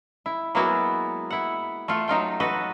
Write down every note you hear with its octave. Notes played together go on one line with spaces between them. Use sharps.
E4
F#3 G#3 A#3 B3 E4 F#4
E4 F#5
A3 F4 A4
F#3 D#4 F4 G5
F#4 A4 B4 D#5